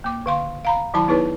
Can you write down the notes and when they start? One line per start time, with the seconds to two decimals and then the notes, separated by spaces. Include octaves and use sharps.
0.04 A#3 D6
0.26 D3 F5 C6
0.65 F5 A#5 B5
0.94 D#3 F#3 E4 A5 B5
1.08 B3 D#4 E4 G#4 B4 C#5